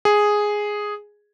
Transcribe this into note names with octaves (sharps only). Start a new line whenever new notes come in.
G#4